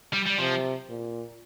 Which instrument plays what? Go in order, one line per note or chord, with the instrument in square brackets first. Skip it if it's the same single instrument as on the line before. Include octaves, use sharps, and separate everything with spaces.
[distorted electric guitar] G3
G3
[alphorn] C3 [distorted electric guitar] F3
[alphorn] A#2